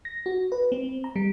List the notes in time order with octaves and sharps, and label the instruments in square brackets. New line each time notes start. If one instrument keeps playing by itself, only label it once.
[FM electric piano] A#6
F#4
B4
C4
A#5
G3